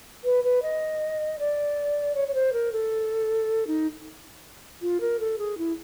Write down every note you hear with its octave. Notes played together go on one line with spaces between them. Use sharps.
B4
B4
D#5
D5
C#5
C#5
C5
A#4
A4
D#4
F4
A#4
A4
G#4
E4